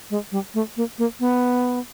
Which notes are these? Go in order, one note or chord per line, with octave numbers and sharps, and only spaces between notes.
G#3
G3
A3
A#3
A#3
B3